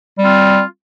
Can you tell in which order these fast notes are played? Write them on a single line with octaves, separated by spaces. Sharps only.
G3 C4 F4